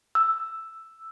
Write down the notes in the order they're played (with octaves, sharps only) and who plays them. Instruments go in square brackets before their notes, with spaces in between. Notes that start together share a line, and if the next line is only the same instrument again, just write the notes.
[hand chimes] E6